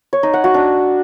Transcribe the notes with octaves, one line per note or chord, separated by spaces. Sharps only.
C#5
D#4
F#5
F#4
D4